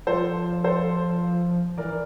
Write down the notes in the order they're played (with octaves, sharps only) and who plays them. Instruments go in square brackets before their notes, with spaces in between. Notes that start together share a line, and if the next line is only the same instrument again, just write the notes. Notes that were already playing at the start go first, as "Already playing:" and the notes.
[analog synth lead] F3 [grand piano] A4 C5
[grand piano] A4 C5
[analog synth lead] E3 [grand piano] A#4 D5